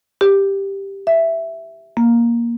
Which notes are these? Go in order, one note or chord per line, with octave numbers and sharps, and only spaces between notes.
G4
E5
A#3